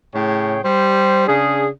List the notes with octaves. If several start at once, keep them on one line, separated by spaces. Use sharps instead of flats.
A2 C#3 G#4 C#5 G5
G3 C5
C#3 D4 G#4